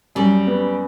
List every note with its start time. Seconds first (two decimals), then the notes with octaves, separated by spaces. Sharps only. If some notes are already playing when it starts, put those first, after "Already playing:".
0.15 F#2 G3
0.47 B3